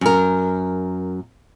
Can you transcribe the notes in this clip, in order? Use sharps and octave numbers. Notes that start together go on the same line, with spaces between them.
F#2 A#4